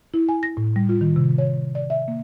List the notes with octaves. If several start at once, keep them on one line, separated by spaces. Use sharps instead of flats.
E4
G#5
A#6
A2
G3
F4
D#3
C3
C#5
D5
E5
A#3